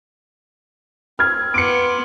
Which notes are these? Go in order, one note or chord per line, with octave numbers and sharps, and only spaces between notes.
C4 F6 G#6
B3 F4 D6 C#7 D7